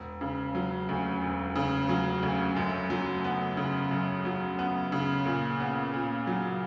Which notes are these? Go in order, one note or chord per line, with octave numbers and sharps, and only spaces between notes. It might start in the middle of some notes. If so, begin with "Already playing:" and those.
Already playing: E1
C#3
F#3
D2
E1
C#3
F#3
D2
F#2
F#3
B3
C#3
F#2
F#3
B3
C#3
A#2
B3
A#2
F#3